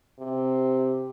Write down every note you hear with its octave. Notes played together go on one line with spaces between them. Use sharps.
C3